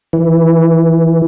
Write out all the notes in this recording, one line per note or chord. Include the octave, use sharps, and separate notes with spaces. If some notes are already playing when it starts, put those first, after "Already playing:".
E3